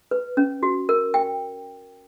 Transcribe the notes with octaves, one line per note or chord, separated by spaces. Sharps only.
B4
C#4
F#4
A#4
G5